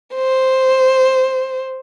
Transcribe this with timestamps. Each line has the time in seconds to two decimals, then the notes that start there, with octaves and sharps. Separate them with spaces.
0.15 C5